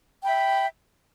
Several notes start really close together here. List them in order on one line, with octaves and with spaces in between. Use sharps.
G5 B5 E5